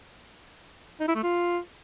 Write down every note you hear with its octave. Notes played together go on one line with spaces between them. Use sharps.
D#4
E4
A3
F4